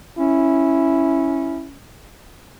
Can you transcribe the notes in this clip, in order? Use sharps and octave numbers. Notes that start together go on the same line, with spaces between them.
C#4 E4